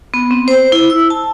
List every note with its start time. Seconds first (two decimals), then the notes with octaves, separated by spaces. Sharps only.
0.14 B3
0.31 C4
0.48 C5
0.72 E4
0.90 E6
1.10 A5